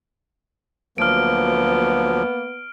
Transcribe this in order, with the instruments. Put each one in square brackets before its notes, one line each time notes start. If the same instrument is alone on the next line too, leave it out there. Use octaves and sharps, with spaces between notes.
[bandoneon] D2 F3 F#3 [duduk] A#3 [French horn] B3 [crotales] F6 D7